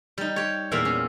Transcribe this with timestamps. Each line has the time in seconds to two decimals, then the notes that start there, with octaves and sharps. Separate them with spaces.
0.18 G3 D#4
0.36 G4 C#5
0.72 E2 A#2 E5 F5
0.85 C#4